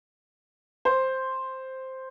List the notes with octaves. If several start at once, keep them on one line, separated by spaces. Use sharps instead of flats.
C5